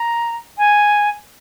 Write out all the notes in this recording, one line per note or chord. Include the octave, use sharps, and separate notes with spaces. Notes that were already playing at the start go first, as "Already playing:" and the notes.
Already playing: A#5
G#5